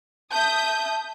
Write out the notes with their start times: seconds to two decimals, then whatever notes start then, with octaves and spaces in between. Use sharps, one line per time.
0.32 E5 A5 D#6 G6